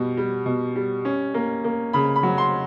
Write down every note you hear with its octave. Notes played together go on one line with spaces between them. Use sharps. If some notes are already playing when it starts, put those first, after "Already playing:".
Already playing: B2 G3
G3
B2
G3
C#4
A#3
A#3
C#3 B5
B5
F#3
C6